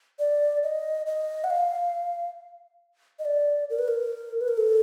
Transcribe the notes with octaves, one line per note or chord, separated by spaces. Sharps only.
D5
D#5
D#5
F#5
F5
D#5
D5
A#4
B4
A#4
B4
A#4
A4